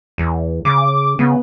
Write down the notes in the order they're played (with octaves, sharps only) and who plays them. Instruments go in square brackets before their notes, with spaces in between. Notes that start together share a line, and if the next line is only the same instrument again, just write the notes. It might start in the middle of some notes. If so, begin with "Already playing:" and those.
[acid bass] E2
[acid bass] C#3 [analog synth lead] D6
[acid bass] C#3 [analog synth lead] B3